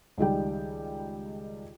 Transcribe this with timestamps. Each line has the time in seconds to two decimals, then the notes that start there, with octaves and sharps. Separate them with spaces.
0.18 C#2 D#3 G3 G5